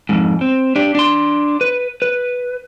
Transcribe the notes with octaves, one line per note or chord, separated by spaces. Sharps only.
F2 G#2
C4
D4 G4
D4 C6
B4
B4